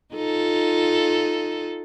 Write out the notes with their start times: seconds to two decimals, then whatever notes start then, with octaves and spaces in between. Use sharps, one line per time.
0.14 D#4 F4 A4